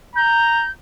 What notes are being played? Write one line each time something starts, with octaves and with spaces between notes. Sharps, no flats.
A#5 G6